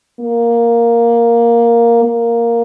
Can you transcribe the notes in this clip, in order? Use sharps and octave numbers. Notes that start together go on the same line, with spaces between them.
A#3
A#3